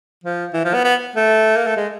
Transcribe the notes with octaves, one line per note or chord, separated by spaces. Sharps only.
F3
E3
F3
B3
B3
A3
A#3
A3
G#3